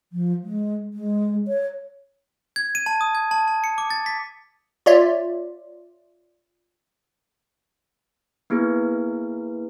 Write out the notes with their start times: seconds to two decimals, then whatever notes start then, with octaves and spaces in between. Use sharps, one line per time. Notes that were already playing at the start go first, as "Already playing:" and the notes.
0.12 F3
0.44 G#3
0.94 G#3
1.48 C#5
2.56 G#6
2.75 D#7
2.86 A5
3.01 D#6
3.15 G#6
3.31 A5
3.48 A5
3.64 C#7
3.78 D6
3.90 A6
4.06 B6
4.86 F4 C#5 D5 E5
8.50 A#3 B3 E4 G#4 B4